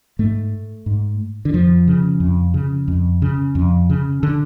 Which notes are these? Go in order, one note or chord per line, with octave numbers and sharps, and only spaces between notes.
G#2 A3
G#2
D3
F2 F3
C#3
F2
C#3
F2
C#3
F2
C#3
D3